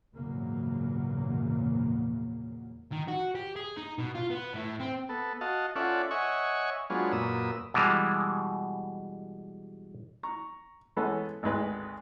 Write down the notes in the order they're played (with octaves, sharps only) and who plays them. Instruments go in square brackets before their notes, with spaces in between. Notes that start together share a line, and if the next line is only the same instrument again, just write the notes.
[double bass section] A#1 E2 G#2 C#3 F#3 A#3
[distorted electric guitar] D#3
F#4
G4
G#4
D#4
B2
F4
B3
A2
C4
[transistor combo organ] B3 A4
F#4 D#5 F5 A5
C#4 F4 A4 D5 E5 F#5
C#5 D#5 E5 F#5 G#5 C#6
F#3 G#3 B3 D4 F4 C#5
F#2 A#2 B4 D#6 E6
[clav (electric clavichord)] B2 E3 G3 G#3
[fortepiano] A#5 C#6
E3 G#3 B3 C#4 A4
G#1 D2 G#3 B4